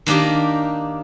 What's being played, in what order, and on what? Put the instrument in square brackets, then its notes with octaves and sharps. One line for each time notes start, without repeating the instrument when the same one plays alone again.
[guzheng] D#3 A#3 D4 G4 D5